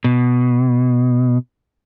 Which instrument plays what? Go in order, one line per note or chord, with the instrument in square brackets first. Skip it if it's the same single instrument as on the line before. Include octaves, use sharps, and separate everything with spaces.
[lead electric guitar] B2